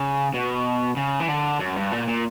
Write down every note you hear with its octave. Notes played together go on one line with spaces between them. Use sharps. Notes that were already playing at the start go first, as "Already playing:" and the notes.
Already playing: C#3
B2
C#3
E3
D3
F#2
G2
A#2
A#2